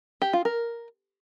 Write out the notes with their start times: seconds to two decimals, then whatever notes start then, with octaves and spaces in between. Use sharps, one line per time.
0.22 G4
0.33 F4
0.45 A#4